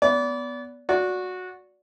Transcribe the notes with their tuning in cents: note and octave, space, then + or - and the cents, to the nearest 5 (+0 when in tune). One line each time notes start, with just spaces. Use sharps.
B3 +0 D5 -30
F#4 -15 D5 -20